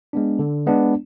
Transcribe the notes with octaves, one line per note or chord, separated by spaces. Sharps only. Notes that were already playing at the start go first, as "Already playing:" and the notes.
G#3 B3 D4
D3
G#3 B3 D4